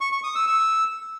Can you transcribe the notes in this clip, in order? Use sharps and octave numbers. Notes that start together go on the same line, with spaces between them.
C#6
C#6
D#6
E6
E6